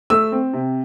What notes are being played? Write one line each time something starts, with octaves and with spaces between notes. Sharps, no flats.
A3 E6
C4
C3